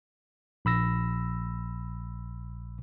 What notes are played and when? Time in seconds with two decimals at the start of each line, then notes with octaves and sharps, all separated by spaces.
0.65 A#1 B5 E6 A#6